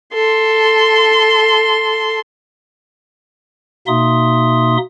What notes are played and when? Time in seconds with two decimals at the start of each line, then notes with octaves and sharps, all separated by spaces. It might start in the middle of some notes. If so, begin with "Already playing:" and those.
0.14 A4 C6
3.87 B2 A#3 D#4 E5 C6 D#6